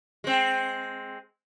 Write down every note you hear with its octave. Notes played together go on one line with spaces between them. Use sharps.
G#3 C4